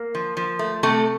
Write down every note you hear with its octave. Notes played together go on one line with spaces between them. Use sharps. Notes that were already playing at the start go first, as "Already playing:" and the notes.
Already playing: A#3
F3
F3
A3
C3 A3 A4